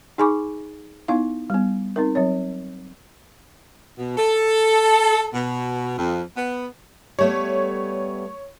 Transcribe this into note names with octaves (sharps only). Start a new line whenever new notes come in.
D#4 G#4 G#5 B5 C#6 D6
B3 D#4 E4 F5
G3 B3
C4 D#4 A#4
F#3 C4 C#5
B2
A4
B2
F2
B3
G3 A3 B3 C#5